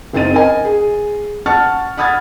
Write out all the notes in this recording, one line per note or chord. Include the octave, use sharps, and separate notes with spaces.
F#1 C4 D#4 A6 D#7
A#4 D#5 G#5
G#4
F#5 A5 C#6 F6 A6
F#5 B5 D#6 F6 G#6 A6